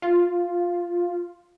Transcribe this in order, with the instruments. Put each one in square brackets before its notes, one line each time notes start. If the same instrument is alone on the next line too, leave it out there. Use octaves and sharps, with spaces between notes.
[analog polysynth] F4